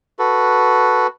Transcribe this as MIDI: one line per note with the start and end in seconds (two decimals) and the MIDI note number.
0.19 1.07 66
0.19 1.07 69
0.19 1.07 71